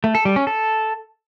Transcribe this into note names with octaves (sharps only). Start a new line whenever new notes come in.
A3
A4
G3
C#4
A4